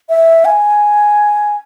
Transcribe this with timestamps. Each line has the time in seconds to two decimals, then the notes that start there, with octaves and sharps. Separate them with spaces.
0.09 E5
0.45 G#5